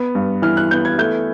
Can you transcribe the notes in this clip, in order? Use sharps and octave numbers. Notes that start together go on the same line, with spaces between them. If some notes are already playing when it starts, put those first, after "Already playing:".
Already playing: B3
G2
E3 F6
F#6
B3 G6
G#6
A3 G6